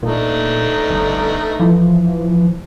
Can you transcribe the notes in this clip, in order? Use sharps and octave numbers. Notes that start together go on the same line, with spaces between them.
A#2 A3 D4 D#4
G1
E3 F3